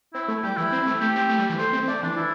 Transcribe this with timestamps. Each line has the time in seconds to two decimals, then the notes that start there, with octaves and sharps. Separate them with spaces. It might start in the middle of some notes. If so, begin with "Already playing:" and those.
0.14 C4 E4
0.28 A3
0.43 G3 G4
0.57 E3 E4
0.72 C4
0.87 A3
1.01 A3 G4
1.16 C4
1.29 A3
1.39 G3
1.49 E3
1.58 A3 C5
1.73 C4
1.88 A3 D5
2.03 E3 D4
2.16 E3 E4